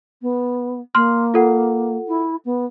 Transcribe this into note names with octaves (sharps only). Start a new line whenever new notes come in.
B3
A#3 C6 F6
F4 A4 F#5
E4
B3